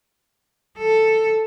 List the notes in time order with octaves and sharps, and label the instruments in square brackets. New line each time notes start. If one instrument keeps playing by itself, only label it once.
[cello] A4